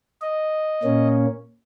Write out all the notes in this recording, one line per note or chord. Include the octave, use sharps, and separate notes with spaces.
D#5
A#2 A#3 C#4